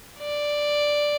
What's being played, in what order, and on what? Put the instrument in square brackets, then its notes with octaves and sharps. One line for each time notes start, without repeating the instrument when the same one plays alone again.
[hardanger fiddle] D5